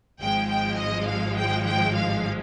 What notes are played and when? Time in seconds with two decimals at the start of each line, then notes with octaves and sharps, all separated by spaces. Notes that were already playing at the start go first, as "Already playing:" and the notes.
0.20 G#1 G#2 F3 G#3 G5
0.49 G5
0.78 D#5
1.07 F5
1.36 G5
1.65 G5
1.94 F5